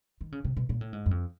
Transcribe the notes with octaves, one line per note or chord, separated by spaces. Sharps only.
D#3
C#3
C3
B2
A#2
A2
G#2
F#2
F2